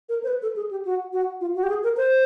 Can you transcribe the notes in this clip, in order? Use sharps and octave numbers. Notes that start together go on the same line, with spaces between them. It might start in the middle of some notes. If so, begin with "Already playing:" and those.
A#4
C5
B4
A4
G#4
G4
F#4
F#4
F4
F#4
G4
G#4
A#4
C5